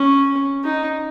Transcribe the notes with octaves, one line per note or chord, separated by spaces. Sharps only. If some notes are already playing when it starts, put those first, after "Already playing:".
Already playing: C#4
D#4